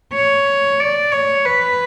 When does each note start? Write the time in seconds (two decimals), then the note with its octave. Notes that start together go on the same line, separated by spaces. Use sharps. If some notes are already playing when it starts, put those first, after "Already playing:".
0.14 C#5
0.80 D5
1.12 C#5
1.45 B4